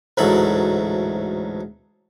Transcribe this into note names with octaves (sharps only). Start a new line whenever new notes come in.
A1 D2 G#2 F#3 A3 B5